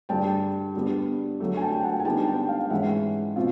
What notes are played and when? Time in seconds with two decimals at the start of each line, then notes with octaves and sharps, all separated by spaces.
0.09 G2 D3 G3 G5 A5
0.74 D3 G3 B3
1.40 D3 F#3 A3
1.57 G#5
1.61 G5 A5
1.73 G5
1.83 F#5 G#5
2.00 G#5
2.05 D3 G3 B3 D#4 G5 A5
2.27 G5 A5
2.49 F5 G5
2.70 G#2 E3 G#3 C#4 E4 E5 F#5
3.36 B2 C4 F4